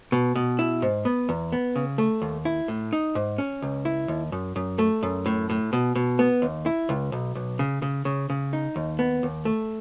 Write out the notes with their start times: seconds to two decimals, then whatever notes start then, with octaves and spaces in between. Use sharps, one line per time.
0.12 B2
0.35 B2
0.59 E4
0.82 G#2
1.05 B3
1.29 E2
1.52 B3
1.76 C#3
1.98 A3
2.22 D#2
2.45 E4
2.68 A2
2.93 D#4
3.15 G#2
3.38 C#4
3.62 C#2
3.85 E4
4.08 D#2
4.32 F#2
4.56 F#2
4.79 A3
5.03 F#2
5.26 A2
5.50 A2
5.73 B2
5.95 B2
6.19 B3
6.42 D#2
6.66 E4
6.89 C#2
7.12 B1
7.35 B1
7.59 C#3
7.82 C#3
8.05 C#3
8.30 C#3
8.53 D#4
8.76 D#2
8.99 B3
9.23 D#2
9.45 A3